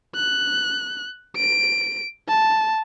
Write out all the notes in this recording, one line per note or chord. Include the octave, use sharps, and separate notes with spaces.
F#6
D7
A5